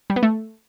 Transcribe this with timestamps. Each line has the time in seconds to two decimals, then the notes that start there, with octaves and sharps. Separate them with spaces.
0.10 G3
0.16 B3
0.23 A3